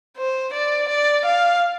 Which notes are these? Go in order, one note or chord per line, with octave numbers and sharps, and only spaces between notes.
C5
D5
D5
F5